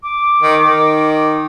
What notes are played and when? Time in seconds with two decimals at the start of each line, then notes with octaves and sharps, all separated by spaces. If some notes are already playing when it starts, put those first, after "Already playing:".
0.03 D6
0.42 D#3
0.63 D#3